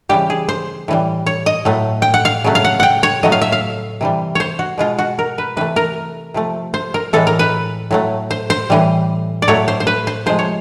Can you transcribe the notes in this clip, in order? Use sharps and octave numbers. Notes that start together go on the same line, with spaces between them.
C#3 E3 G3 G4
G#4
C5
A2 E3 G3
C#5
D#5
A2 F#3 A3
G5
F#5
F5
C#3 F#3 A3
F5
F#5
F#5 G5
C#5
A2 F#3 A3 D#5
F5
E5
F5
C3 E3 G3
C5 C#5
F#4
B2 G#3 F4
F#4
A#4
B4
C3 E3 A3 B4
A#4
C3 F3 A3
C5
A#4
A2 E3 G#3 A4
A#4
B4
A2 F#3 A3
C5
C5
A2 E3 G3
D5
A2 F#3 A3 C#5
C5
C5
B4
C5
C3 F3 G#3 C5
C#5